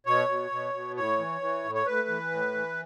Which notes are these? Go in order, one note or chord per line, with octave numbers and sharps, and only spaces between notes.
B2 C#5
B2
B2
B2
A2 C#5
E3
E3
A2
C#5
A2 B4
E3
A2
E3